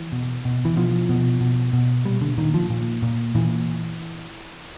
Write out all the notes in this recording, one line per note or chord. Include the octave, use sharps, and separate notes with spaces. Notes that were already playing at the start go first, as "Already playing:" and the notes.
Already playing: E3
B2
B2
E3
B2 F3
B2
B2
B2
A#2 G3
D3
A#2 D#3
F3
A#2
A#2
A#2 E3